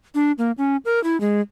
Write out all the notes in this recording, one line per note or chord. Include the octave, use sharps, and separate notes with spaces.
D4
A#3
C#4
A#4
E4
G#3